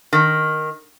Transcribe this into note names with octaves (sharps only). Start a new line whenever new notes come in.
D#3